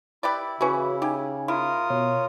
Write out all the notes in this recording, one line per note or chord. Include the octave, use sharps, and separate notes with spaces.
E4 G4 B4 D5
C#3 E3 C#4 F#4 B4 C#5
D#4 G4 G#5
E4 F4 A#4 D#6
B2 C#5